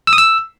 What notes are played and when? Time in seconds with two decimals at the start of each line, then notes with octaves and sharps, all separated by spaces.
0.07 E6
0.13 D#6
0.18 E6